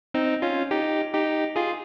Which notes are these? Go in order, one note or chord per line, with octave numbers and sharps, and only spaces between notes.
C4 D#4
C#4 F4
D#4 G4
D#4 G4
F4 G#4